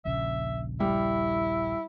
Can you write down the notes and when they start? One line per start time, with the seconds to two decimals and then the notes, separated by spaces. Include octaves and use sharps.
0.05 D#1 A#1 C#3 E5
0.80 G3 E4